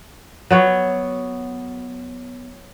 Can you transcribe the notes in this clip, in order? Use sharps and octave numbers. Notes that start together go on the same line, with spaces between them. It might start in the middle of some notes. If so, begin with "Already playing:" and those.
F#3 B3 C#5